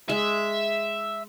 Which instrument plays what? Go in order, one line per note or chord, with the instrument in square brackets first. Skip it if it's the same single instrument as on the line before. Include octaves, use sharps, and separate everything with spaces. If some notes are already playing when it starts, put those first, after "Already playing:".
[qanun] G#3 [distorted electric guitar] E5